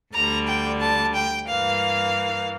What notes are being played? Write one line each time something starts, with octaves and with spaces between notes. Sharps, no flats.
D2 D3 G3 A#5
G5
A5
G5
G2 E3 A#3 F5